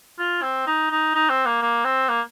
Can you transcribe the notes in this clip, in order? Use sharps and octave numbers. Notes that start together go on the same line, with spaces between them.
F4
C4
D#4
D#4
D#4
C4
A#3
A#3
C4
A#3